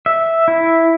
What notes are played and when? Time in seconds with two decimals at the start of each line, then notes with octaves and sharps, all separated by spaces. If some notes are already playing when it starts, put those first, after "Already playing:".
0.06 E5
0.48 E4